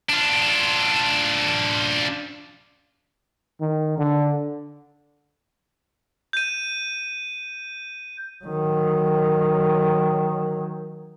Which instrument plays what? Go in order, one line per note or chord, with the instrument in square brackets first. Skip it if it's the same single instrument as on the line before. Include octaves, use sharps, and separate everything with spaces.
[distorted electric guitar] D4 F4
[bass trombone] D#3
D3
[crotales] G6 D#7
[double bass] D#3 F#3